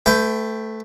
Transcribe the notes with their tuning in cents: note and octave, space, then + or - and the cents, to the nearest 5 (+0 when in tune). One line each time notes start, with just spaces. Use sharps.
A3 +0 B4 +35 G5 +0